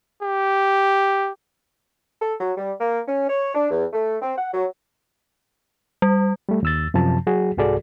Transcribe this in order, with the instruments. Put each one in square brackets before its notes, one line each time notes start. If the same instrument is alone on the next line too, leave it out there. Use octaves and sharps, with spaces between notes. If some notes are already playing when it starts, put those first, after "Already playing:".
[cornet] G4
[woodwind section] A4
F#3
G3
A#3
C#4
C#5
D4
E2
A3
C4
F#5
F#3
[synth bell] G3
[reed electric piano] G3 A3
D#2 E6 A6
F#2 C3 F3 A5
F#3 F#4 G#4
C2 G#2 F#4 G#4 A4 D5